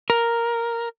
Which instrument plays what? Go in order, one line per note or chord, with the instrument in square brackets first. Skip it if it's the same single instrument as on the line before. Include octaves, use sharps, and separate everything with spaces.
[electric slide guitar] A#4